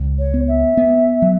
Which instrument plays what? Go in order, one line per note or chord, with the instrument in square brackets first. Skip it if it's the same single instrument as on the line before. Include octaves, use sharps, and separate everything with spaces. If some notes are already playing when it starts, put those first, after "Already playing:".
Already playing: [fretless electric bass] C#2
[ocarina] C#5
[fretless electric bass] B3
[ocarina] E5
[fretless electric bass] B3
F#3